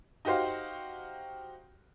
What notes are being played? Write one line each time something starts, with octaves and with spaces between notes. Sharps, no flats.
D#4 F#4 G4 C5 F5